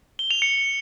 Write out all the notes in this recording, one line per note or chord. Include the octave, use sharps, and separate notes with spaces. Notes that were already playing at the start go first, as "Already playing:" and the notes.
G7
F7
C#7